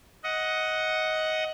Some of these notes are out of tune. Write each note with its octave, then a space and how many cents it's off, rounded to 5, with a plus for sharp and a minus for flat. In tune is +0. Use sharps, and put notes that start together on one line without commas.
D#5 +15 F#5 +0